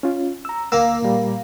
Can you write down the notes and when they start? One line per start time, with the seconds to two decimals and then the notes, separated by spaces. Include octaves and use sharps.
0.03 C#4 F4
0.45 A#5 E6
0.72 D2 A#3 E6
1.02 A#2 G3